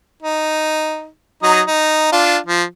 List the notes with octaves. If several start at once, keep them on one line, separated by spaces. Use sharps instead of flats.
D#4
F#3 D#4 D#6
D#4
D4 F4
F3